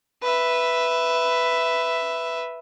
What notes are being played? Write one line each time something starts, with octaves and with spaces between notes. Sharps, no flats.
B4 E5